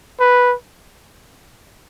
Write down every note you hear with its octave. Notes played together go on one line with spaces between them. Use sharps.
B4